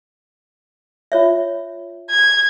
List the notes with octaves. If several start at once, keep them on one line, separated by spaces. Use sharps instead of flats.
F4 C#5 E5
G#6